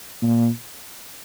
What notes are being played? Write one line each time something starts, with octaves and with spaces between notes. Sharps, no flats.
A#2